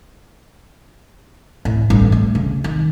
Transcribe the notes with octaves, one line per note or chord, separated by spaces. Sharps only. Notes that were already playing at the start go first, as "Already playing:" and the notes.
A2
A1 G2
A3
C#3
D#3